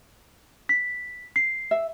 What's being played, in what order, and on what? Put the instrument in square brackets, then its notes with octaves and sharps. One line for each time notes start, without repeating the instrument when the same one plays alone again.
[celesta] B6
C7
[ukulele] E5